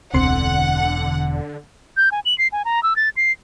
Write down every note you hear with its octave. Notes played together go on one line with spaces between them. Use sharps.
E1 C#2 D3 C4 F#5 C6
G6
G#5
F#7
C7
G#5
A#5
E6
A6
C7